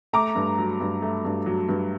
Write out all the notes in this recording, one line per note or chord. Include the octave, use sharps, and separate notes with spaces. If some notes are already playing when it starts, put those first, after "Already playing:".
A3 A#5 D6
G2
F#3
G2
A3
G2
F#3
G2